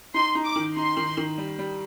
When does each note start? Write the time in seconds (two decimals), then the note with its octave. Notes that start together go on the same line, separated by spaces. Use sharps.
0.14 D#4 C6
0.35 D#4
0.45 D6
0.56 D#3
0.76 D#4 C6
0.97 D#3
1.17 D#3
1.38 G3
1.59 G3